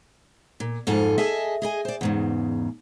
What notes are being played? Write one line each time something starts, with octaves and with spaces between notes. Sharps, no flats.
A#2
F2 G#2 F4 A4 G#5
G#4 D#5 E5 G#5 A5
G#4 D#5 G#5
C5 D5
E2 G#2 C#3